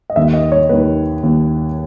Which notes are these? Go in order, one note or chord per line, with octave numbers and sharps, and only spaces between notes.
D#5
D#2 D#3 E5
D#5
C#5
D#2 D#3 B4
D#2 D#3